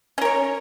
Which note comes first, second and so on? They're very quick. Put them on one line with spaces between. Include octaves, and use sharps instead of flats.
C#4 A#4 C#5